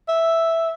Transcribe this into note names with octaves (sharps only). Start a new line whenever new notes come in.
E5